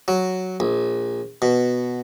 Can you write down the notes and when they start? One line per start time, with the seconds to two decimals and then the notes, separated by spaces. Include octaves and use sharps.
0.08 F#3
0.60 A#1
1.42 B2